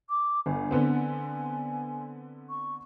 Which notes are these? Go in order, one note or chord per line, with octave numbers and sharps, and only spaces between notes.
D6
G1 G#5
D3 B3 C4
G#5
C#6